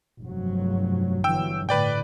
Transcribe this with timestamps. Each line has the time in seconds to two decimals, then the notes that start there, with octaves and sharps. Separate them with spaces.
0.20 F1 G2 F#3
1.24 G1 E3 F#3 G5 E6
1.69 A2 D3 B4 D5 G5